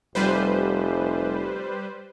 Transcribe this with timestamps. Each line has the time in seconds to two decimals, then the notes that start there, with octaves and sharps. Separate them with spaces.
0.15 F1 G3 B4 C5